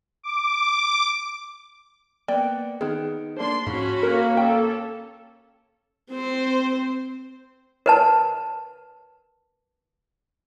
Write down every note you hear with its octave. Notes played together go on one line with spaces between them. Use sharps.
D6
A#3 B3 D5 G5
D#3 B3 G#4
A#3 D4 C5 C6
G#2 F3 C#4 F#4 B5
A#3 A#4
C#4 A4 G5
C4 C5
A#4 B4 A5